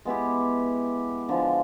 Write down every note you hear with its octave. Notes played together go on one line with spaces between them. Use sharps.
G#3 B3 E4 G4
D3 F3 G#3